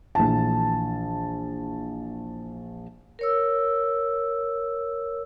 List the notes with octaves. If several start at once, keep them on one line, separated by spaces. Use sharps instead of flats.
A#1 E3 A5
A#4 C#5 E6